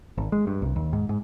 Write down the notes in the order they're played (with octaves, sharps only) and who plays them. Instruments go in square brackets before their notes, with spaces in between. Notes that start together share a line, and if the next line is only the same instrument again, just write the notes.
[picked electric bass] G#1
G#3
G2
C2
D#2
G#2
G#2